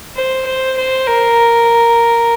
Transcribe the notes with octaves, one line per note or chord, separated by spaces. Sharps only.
C5
C5
C5
A#4